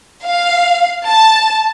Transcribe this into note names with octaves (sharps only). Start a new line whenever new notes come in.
F5
A5